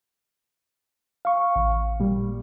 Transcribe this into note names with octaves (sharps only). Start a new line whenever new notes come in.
F5 C#6
A1
A#2 G3